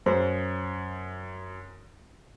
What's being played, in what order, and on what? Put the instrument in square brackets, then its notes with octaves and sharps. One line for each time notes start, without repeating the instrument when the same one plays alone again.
[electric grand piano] F#2 [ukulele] C5